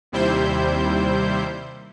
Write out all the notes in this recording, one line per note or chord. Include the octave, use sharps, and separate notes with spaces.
D#2 C3 G3 E4 C5 G6